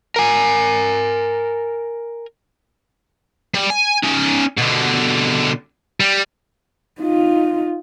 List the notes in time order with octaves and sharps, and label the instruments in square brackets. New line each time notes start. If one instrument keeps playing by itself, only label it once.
[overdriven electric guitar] A#4 G#5
[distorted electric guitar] G3
G#5
C#4 D#4
B2 D3
G3
[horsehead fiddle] D#4 F4